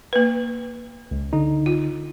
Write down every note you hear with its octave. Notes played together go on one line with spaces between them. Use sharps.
A#3 B4
C#2
D3 D#4
F4